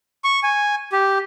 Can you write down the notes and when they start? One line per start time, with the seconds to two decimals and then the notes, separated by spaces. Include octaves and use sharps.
0.24 C#6
0.43 G#5
0.92 G4